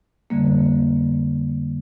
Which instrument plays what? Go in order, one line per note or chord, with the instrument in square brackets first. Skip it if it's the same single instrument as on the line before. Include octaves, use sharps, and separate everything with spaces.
[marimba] F2 D3 G3 A#3